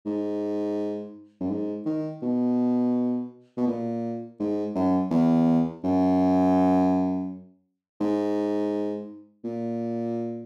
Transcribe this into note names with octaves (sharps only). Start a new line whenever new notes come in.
G#2
F#2
G#2
D#3
B2
B2
A#2
G#2
F#2
E2
F#2
G#2
A#2